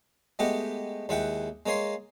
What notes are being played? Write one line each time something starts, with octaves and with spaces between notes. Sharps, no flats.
G#3 A3 B3 G4 D#5 F#5
D#2 G#3 E4 B4 F#5 G5
G#3 A#3 C#5 G#5 C6